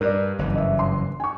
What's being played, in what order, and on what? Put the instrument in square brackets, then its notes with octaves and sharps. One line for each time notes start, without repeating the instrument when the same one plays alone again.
[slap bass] G2 [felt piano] A#4 D5
[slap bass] F#1 G2 E3
[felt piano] D#5 E5
C6
G#5 C#6